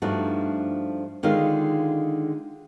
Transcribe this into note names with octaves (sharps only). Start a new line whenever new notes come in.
G2 F3 A3 D4 D#4 F#4
D3 D#3 G#3 F4 F5